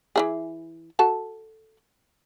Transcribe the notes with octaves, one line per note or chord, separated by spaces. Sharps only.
E3 E4 G#4
F#4 A4 A5